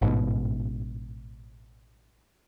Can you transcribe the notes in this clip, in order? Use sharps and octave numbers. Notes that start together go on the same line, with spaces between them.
A1 G#2 B2